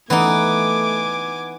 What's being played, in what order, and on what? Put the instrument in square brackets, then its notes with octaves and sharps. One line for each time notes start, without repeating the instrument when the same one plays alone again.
[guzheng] E3 D#4 [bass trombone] A3 [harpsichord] B3 F#5 [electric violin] G#5 D6